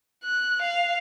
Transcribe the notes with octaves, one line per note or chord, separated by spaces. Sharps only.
F#6
F5